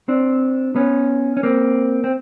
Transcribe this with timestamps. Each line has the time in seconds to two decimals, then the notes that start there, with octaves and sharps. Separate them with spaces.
0.08 C4 D4
0.76 B3 C#4
1.37 C#4
1.43 A#3 C4
2.04 C4